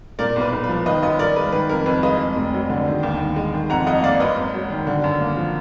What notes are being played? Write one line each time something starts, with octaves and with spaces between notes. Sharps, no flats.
A#2 A#4 D5
B1
B4
B1
B4
F3
D#3 B4 D#5
F#2 B4 D#5
F#2 A#4 D5
G#3 B4
D#3 B4
F2 A#4
F2 B4
G#3 B4 D#5
F2
F1
F#3
D3
D#3
D#2
D#2
G#3
D#3
F2 F#5 A#5
F2 D#5 F#5
A#3 D5 F5
F#2 B4 D#5
G#1
F#3
D#3
D3
F#2
A#3
F3